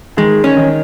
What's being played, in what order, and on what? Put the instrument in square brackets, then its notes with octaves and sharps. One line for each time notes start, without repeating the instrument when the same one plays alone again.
[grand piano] D#3 [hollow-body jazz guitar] G#3
[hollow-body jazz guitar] C#4
[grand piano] D#3